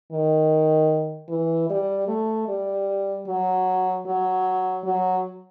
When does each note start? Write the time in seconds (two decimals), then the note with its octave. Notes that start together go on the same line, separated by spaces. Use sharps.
0.12 D#3
1.29 E3
1.69 G3
2.08 A3
2.48 G3
3.27 F#3
4.06 F#3
4.85 F#3